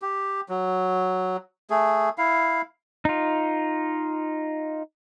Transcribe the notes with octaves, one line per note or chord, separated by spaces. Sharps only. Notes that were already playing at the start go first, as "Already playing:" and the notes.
G4
F#3
A3 G#4
E4 F5
D#4 F4